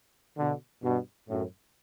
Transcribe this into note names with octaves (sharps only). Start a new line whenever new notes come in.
B2 D3
G2 B2
F#2 A2